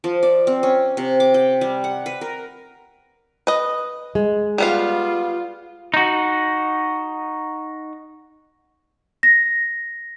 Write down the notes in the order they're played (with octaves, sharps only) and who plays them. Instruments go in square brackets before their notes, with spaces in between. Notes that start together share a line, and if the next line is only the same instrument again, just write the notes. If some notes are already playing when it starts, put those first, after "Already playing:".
[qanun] F3
D5
C4
C#4
C3
D6
G5
G3
F#5
B4
A#4
[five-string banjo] B4 D#5
[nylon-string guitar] G#3
[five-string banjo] G3 B3 F5 [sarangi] F4
[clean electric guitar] D#4 F#4
[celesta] A#6